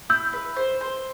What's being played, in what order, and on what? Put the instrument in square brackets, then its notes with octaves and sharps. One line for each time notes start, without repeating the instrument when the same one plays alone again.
[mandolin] E4 [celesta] E6 G6
[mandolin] B4
C5
C5